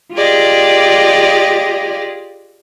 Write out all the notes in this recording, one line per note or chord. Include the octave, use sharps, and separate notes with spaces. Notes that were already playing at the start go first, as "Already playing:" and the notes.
F4 G4 G#4 D5 D#5